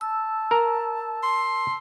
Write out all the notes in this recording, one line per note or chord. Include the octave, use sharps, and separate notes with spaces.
A5 E6
A#4 A#5
C6